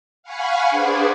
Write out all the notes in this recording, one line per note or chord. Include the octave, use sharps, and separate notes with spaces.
F5 F#5 G#5 B5 C#6
D4 G#4 B4 C5 D5